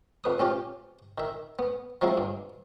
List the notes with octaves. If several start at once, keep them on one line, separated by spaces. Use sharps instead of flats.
F2 B4 D#6
C4 C#4 F4 G4
D#3 E5
B3
F3 F#3 G#3 C4 E4
G2